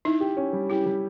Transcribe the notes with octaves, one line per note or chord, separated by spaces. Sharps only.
D#4 E4
G4
C#4
G3
E4 G4
G3